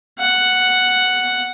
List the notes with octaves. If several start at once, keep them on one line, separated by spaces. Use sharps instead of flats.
F#5